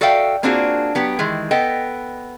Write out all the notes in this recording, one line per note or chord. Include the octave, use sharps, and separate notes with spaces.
F#4 A4 D5 E5 F5 G5
A#3 C4 D4 F4 F#4 G#4
F#3 B3 G4
D#3 E3 G#3
B3 A4 D#5 G5